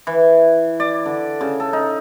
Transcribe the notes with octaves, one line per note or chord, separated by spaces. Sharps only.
E3
D5
D3
C#3
A4
D#4